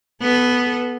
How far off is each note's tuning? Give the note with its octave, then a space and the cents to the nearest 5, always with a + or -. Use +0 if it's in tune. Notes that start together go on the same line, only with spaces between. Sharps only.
B3 +0 A4 -25